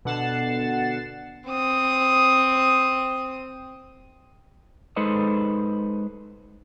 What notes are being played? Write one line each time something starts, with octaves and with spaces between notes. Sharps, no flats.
B2 D3 F#5 A6 C7 E7
C4 D#6
G#3 D#4 A4 B4 C5 D#5